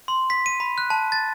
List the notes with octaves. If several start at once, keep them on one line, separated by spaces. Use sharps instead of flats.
C6
B6
D#7
B5
F#6
A5
A6